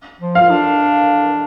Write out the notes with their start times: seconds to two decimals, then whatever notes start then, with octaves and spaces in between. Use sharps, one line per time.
0.21 F3
0.35 F4 F5
0.50 D4